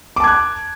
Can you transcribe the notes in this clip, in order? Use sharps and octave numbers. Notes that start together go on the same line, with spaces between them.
A5 D6 F#6 G#6